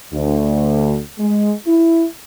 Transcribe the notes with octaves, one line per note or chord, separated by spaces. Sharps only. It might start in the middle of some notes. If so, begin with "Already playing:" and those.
D2
G#3
E4